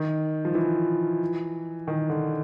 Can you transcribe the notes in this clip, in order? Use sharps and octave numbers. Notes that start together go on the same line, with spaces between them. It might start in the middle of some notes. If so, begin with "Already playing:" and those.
Already playing: D#3
F3
E3
D#3
D3